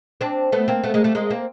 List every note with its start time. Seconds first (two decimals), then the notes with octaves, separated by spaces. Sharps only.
0.21 C4 D4
0.52 A3 B3
0.68 A#3 C4
0.84 A3 B3
0.94 G#3 A#3
1.04 G3 A3
1.15 G#3 A#3
1.30 A#3 C4